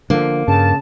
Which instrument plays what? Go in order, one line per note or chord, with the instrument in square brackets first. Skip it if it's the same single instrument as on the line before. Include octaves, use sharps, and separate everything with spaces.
[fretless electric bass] D3 F3 [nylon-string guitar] A#3
[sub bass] G2 [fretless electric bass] C#3 [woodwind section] A5